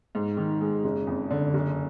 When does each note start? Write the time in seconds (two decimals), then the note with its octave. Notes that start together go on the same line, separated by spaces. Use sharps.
0.15 G#2
0.37 D#3
0.61 G#3
0.84 F#1
1.07 F2
1.30 D3
1.54 F#1